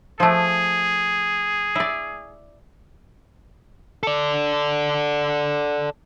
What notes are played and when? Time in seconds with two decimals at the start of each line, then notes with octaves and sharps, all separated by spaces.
0.20 F3 A3 G#4
1.75 E4 D5
4.03 A4 D5